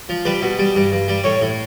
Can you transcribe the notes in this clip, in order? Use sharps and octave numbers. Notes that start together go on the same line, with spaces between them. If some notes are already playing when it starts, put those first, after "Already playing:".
F3
G3 B4
B2
G3
G2
G2
G3
A2 C#5
A2